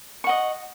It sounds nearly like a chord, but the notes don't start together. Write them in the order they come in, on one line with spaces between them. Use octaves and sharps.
C#6 F#5 D#5